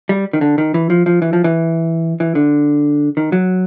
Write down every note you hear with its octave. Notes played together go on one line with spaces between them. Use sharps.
G3
D#3
D3
D#3
E3
F3
F3
E3
F3
E3
E3
D3
D#3
F#3